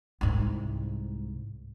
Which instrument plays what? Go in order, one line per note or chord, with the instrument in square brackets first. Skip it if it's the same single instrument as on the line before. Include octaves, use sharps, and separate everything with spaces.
[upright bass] C2 G#2